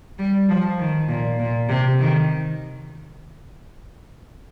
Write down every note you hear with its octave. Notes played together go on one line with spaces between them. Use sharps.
G3
F3
D#3
A#2
A#2
C3
D#3